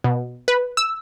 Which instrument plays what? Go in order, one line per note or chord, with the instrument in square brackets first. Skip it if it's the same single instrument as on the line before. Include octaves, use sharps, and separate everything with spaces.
[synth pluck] B2
B4
E6